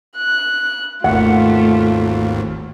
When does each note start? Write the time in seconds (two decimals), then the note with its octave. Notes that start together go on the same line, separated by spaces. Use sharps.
0.17 F#6
1.04 G#1 D#2 A3 F4 F#5